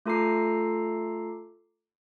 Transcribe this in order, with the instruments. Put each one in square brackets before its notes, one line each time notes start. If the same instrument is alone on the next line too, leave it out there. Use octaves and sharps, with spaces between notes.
[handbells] A3 F4 A4 A#5 D6 C7